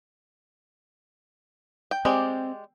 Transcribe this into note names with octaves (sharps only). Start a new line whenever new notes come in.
G5
G#3 C4 G4 D5